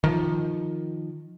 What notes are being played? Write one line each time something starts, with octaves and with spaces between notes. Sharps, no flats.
D#3 F3